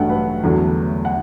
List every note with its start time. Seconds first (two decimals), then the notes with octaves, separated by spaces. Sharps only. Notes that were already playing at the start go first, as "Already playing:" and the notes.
Already playing: A1 G2 F#3 A3 D4 F#5 G5
0.10 B4
0.44 E2 D3 F#3 A3
1.05 F#5